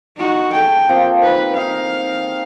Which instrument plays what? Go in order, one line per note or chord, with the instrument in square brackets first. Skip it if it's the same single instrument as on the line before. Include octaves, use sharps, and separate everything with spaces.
[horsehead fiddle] D#4 F#4
[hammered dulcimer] G#4 A4 A5 [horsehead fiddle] G5
[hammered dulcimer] F3 A#3 C4
[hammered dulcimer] D#4 [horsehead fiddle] B4
[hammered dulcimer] D#4 [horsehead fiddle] F5